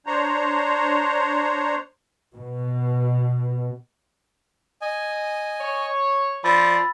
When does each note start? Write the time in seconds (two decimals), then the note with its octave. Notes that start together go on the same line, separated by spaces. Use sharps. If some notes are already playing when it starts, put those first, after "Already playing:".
0.07 D4 C5 C#5 A#5
2.35 B2
4.82 D#5 G#5
5.59 C#5
6.44 F3 D5 B5 E6 A6